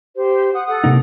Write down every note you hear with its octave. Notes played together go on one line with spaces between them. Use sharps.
G4 C5
F#5 D#6
A4 F#5 D#6
C3 A#3 D#4